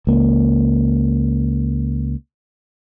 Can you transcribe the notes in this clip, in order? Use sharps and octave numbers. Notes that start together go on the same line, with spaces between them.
C#2 A#3